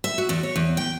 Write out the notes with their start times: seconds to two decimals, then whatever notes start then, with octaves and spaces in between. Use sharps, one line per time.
0.04 E5
0.18 F#4
0.29 E2
0.43 C#5
0.56 E2
0.77 G5